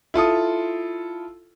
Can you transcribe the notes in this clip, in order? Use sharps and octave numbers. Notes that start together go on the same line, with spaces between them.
E4 F4 A4 D#6